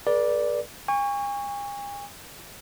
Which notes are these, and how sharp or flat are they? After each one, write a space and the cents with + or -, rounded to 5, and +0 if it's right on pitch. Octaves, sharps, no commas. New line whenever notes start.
G#4 +35 B4 -45 D5 +0
G#5 -40 C#6 +5